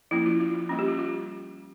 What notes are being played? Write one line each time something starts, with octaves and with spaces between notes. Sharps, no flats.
F3 A#3 C#4 E4
F4
F4
F4
G3 A#3 C#4 F4
G4
F4
F4